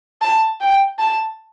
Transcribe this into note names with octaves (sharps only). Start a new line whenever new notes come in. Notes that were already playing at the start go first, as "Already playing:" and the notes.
A5
G5
A5